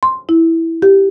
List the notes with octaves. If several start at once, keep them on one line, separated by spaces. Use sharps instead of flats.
C6
E4
G4